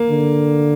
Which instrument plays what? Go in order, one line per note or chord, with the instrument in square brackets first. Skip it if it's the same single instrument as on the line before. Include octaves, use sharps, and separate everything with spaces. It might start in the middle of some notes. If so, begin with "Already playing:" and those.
Already playing: [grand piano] A#3
[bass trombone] D3